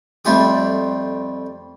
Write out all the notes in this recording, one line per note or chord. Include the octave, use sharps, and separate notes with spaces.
F2 G3 A3 F4 G4 D#6